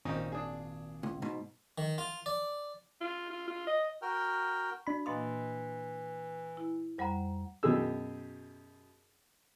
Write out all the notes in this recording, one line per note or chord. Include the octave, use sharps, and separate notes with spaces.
G#1 A#2 C4 C#4 D#4
D4 G#4
C#2
G#2 B2
D#3
F4
D5
F4
F4
F4
D#5
F#4 A#4 G5 F6
D4 F#4 B5
A#2 E3 A#3 D#5 F5 C6 D#6
E4
F2 G3 C5 F#5 A#5 B5
F#2 B2 G4 G#4 E6